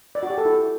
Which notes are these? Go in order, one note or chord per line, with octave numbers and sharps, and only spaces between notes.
D5
F#4
G4
A4
E4